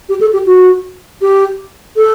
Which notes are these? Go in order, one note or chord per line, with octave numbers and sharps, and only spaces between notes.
G4
A4
G4
F#4
G4
A4